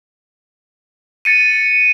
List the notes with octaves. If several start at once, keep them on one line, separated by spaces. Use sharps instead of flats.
A6 C#7 D#7